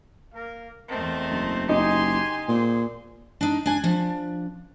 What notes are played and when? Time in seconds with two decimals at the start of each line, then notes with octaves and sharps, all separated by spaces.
0.34 A#3 A#4 F5
0.89 E2 A3 C4 A#4 D#5 A5
1.30 F#1
1.69 F#1 D#4 G4 G#5 C6
2.49 A#2 G#4 C5 C6
3.41 D4 D#4
3.66 D4 G#5
3.84 F3 D4